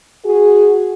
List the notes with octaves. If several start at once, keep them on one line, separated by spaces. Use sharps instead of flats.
F#4 G#4